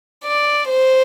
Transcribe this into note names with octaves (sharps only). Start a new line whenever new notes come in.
D5
C5